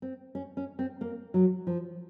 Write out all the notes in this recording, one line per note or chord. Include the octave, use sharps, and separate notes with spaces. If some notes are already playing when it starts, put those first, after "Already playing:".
C4
C#4
C#4
C4
A#3
F#3
F3